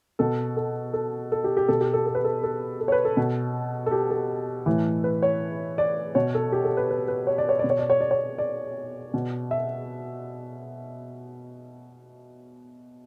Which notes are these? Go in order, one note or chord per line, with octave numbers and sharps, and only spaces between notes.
B2 A4
A4
A4
A4
G4
G4
B2 A4
G4
A4
A4
B4
A4
A4
A4
C#5
B4
A4
B2
A4
G4
A4
A2 E3
B4
C#5
D5
B2 C#5
A4
G4
A4
B4
B4
B4
C#5
D5
C#5
B2 D5
C#5
D5
C#5
D5
C#5
D5
B2
E5